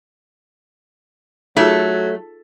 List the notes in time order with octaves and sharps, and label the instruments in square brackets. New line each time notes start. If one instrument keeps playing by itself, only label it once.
[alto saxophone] F#3 [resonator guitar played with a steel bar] A3 [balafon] D#4 F4 G#4